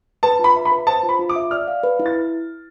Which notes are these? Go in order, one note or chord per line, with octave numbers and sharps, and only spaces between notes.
B4 A5
F4
B5
E5
B5
B4
C5 A5
F4
B5
F4
D6
E5
D5 F6
F5
B4
E4
A6